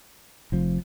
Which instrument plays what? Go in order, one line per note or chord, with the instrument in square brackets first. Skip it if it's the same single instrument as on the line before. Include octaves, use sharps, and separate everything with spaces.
[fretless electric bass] F1 F2 F3